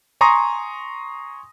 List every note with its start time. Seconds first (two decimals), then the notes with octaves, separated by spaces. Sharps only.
0.21 G#5 A#5 C6 C#6 D#6 A#6